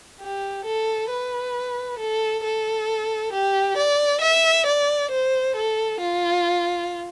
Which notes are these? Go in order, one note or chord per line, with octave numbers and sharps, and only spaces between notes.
G4
A4
B4
A4
A4
G4
D5
E5
D5
C5
A4
F4